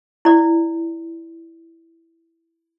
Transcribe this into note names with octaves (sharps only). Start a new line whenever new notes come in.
E4 D5